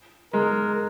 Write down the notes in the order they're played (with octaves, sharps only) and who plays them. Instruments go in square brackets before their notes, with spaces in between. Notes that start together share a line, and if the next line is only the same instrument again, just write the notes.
[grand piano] G#3 [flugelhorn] A#4